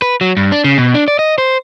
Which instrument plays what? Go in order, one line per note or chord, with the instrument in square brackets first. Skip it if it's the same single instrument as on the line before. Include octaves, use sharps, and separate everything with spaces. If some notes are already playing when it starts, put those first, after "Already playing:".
[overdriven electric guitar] B4
F#3
G2
D4
C#3
B2
D4
D5
D#5
C5